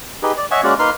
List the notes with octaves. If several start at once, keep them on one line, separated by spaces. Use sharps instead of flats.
D#4 G4 G#4 B4
D5
C#5 D#5 E5 F#5 G#5 C#6
G#3 A#3 C#4 F#4 A#4 D5
A#3 D#4 B4 C6 F6